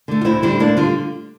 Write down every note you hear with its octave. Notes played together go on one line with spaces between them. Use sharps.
D3 A3
F4
D2 C4 E4
D3 G3 C4 E4
D2 A#3 D4
D3 G3 F4